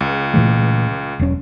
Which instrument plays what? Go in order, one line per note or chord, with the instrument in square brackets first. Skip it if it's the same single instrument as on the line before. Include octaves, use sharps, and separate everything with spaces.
[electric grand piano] C#2
[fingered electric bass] A#2 E3 A3
E1 F#3 C#4